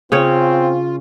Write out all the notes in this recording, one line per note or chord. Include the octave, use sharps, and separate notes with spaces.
C#3 C4 C#4 F4 C#5